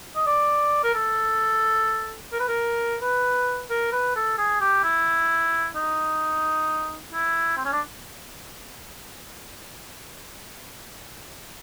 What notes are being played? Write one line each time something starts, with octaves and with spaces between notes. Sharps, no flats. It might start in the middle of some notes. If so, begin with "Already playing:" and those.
D#5
D5
A#4
A4
A#4
B4
A#4
B4
A#4
B4
A4
G#4
G4
E4
D#4
E4
C4
C#4
D4